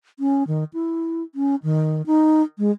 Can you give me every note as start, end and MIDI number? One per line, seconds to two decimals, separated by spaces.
0.19 0.44 61
0.47 0.64 51
0.74 1.23 64
1.35 1.56 61
1.63 2.02 51
2.06 2.42 63
2.58 2.71 56